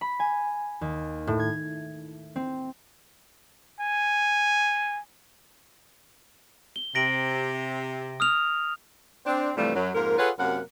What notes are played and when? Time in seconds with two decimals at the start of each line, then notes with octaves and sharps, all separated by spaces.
0.01 B5
0.20 G#5
0.81 D#2
1.27 A2
1.40 G#6
2.36 C4
3.80 G#5
6.76 G7
6.95 C3 A#6 D7 F#7
8.20 D#6 F6 F7
9.26 C4 D4
9.57 G2 C3 E3 F3 G3 A3
9.75 F#2 F#3
9.95 F2 G#2 A#3 A#4
10.18 F4 G#4 A4 B4 C#5 F#5
10.39 F#2 C3 A#3 A#4 F#5